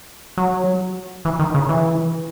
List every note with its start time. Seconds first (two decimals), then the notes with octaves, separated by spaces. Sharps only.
0.37 F#3
1.25 E3
1.39 D#3
1.54 C#3
1.69 E3